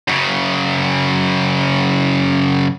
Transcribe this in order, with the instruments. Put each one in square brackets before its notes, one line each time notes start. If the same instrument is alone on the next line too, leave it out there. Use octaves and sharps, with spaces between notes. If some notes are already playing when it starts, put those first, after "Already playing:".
[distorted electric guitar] F#2 C#3